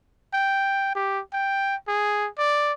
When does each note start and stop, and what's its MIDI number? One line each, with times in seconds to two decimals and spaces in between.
0.33 0.94 79
0.95 1.20 67
1.33 1.75 79
1.88 2.28 68
2.38 2.73 74